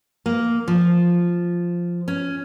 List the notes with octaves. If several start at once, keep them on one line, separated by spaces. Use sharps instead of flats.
A#3
F3
C#4